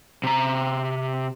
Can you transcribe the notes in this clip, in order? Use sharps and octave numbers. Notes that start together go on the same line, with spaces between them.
C3 A#5